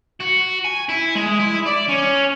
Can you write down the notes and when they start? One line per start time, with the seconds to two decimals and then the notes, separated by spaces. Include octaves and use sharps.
0.21 F#4
0.64 G#5
0.89 E4
1.15 G#3
1.40 E4
1.66 D5
1.89 C#4